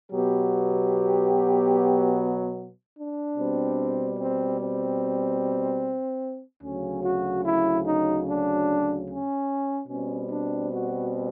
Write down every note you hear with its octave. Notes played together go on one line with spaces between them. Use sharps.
B2 F#3 B3 G4
D4
B2 G3 C4
C4
C4
D2 C#3 F#3 C#4
F#4
E4
D#4
D4
C#4
B2 G3 C4 C#4
D4
F#4